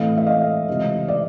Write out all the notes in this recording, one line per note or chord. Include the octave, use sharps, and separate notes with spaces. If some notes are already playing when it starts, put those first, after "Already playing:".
Already playing: A2 E3 A3 C4 D#5 F5
E5
D#5 F5
C#2 C3 E3
D5 E5